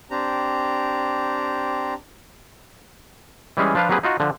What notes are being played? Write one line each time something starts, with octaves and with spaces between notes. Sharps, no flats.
C4 D4 G4 A#5
E3 G3 G#3 C#4 G#4
F3 D4 F4 B4 F5
F#3 A#3 C4 G4 G#4 B4
D#4 F4 F#4 D#5
D3 F3